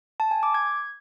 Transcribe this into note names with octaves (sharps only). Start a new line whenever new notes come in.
A5
G#5
D6
G#6